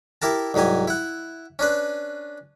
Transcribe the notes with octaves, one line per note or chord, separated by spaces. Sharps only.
E4 G4 A#4 A5
C2 G#2 F#3 G4 G#5
E4 F#5
C#4 D4 B4